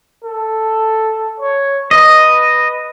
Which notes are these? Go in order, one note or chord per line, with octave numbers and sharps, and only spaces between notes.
A4
C#5
B4 D#5